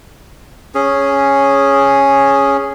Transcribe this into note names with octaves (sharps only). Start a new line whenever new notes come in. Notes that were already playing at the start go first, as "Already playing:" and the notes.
C#4 G#4